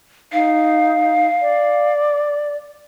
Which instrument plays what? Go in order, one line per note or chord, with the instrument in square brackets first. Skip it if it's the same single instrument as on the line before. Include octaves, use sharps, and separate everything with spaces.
[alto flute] D#4 [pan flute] F5
[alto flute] D5